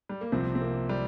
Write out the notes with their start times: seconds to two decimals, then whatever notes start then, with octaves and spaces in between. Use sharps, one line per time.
0.09 G3
0.21 A#3
0.32 C2 C3 F3 C4
0.55 C4
0.61 A#3
0.89 G3